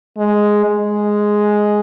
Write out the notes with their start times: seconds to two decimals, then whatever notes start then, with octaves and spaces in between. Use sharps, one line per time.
0.17 G#3
0.65 G#3